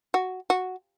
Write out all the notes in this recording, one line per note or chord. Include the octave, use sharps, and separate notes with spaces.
F#4
F#4